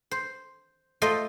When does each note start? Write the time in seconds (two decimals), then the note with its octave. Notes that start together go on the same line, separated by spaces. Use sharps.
0.11 C5
1.02 A3 F4 C5 D#5